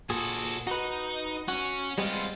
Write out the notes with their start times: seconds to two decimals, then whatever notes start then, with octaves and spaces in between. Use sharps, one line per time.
0.10 A#2 F#4 G#4 A4
0.67 D#4 F#4 B4
1.48 C#4 F#4
1.98 G3 G#3 B3 C4 F4